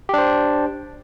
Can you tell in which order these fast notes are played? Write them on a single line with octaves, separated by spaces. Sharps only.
G4 D4 C5